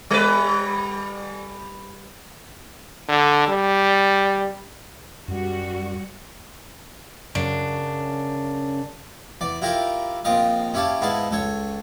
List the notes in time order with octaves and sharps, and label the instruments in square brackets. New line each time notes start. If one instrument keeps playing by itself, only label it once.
[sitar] G3 B4
[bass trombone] D3
G3
[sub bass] F#2 [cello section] G3 F#4
[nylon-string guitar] F#2 C#3 [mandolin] D4
[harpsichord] E2 D5
E4 F4 G4 A#4 E5 F5
A#1 A#2 C4 F4 D#5 F5
C#4 E4 G4 F5 A5
G#2 B3 E4 G#4 F5 A5
C#2 A4 C#5